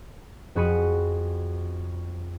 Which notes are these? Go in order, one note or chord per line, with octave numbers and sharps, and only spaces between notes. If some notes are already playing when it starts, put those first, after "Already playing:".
F2 F#4 G#4 B5 C#7 D#7